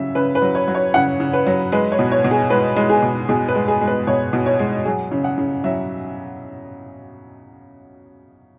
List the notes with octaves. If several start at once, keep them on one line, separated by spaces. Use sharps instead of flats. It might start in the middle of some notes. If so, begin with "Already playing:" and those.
Already playing: C#3 F#3 E5
C#3 B4
B4
F#3
C#5
F#3
C#5
C#3 F#5
C#3
B4
F#3
G#3 B4
C#5
B2
C#5
B2
G#4
G#3 B4
G#3
G#4
B2
B2 G#4
B4
G#3
G#4
G#3
B4
B2 C#5
B2
C#5
G#3
F#3 G#4
C#3
F#5
C#3
F#3 E5